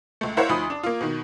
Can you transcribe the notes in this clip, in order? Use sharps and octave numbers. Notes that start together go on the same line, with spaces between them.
C#2 A3
E4 A#4 C5 C#5 F5 F#5
D2 F3 D#4 B5 D#6
D4
A#3 F4
B2 D#3